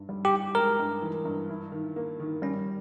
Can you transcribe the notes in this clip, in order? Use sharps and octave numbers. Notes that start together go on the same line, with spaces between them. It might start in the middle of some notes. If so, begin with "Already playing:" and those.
Already playing: G2
G3
G4
E4
G#3 A#4
G2
E3
G2
E4
D#3
A#3
D#3
G3 C#4